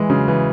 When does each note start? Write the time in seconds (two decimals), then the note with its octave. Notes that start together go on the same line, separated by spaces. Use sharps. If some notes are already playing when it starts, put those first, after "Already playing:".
Already playing: E3 G#3
0.10 C#3 F#3
0.28 E3